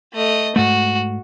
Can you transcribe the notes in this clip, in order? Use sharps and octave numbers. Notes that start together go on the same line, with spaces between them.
A3 D#5
G#2 A3 F#4